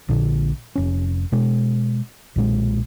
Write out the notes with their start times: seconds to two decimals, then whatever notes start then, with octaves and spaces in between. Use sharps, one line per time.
0.09 A#1 A#2 D3
0.76 F1 C#4
1.32 B2 G#3
2.36 B1 A#2 G#3